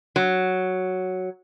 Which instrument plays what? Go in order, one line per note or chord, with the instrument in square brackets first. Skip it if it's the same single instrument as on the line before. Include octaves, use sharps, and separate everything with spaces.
[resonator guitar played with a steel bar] F#3